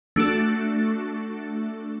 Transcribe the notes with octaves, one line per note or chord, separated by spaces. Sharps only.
A3 D4 F#4 A4